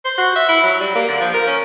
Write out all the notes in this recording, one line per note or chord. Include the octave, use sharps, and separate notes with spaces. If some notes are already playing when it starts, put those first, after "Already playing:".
C5
F#4
E5
E4
F#3
G3
A#3
D3
F3
A#4
C#4